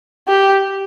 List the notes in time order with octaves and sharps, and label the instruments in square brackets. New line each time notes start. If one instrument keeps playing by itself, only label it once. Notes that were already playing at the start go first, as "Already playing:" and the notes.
[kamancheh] G4